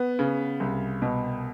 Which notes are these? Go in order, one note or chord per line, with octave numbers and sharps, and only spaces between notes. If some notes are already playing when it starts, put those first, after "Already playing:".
Already playing: B3
C#3
C2
B2